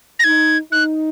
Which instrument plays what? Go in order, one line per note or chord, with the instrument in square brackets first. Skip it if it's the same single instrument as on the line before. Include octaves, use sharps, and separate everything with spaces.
[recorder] A#6
[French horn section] D#4 [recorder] G#6
[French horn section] D#4 [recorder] F#6